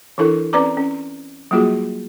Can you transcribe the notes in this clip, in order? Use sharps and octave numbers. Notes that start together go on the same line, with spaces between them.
E3 D4 E4 A4 A#4
C4 C#4 B4 D5 A#5 D6
C#4
F#3 G3 A#3 F4 F#4 G#4